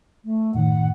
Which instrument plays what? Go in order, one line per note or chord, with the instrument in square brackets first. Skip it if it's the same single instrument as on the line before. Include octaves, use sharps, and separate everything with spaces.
[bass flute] A3
[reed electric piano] F#2 A2 D#3 [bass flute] F#5